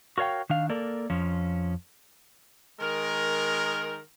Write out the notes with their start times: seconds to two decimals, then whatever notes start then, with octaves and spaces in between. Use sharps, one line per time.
0.18 F#4 A#4 C#5 F5 G5
0.50 D#3 D4 F5
0.69 A#3 A4 A#4 D5
1.10 F2 F3 C#4
2.79 D#3 G#3 A#4